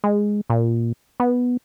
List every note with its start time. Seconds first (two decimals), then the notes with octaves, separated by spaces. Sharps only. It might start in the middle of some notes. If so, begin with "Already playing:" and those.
0.04 G#3
0.50 A#2
1.20 B3